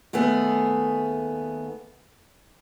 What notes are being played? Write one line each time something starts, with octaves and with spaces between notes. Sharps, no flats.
D#2 A3 B3 G#4